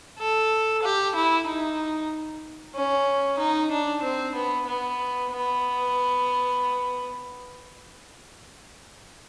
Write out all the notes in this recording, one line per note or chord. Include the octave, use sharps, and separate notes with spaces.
A4
G4
E4
D#4
C#4
D#4
D4
C4
B3
B3
B3